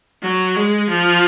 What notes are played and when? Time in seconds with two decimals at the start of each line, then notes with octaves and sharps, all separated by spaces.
0.22 F#3
0.56 G#3
0.89 F3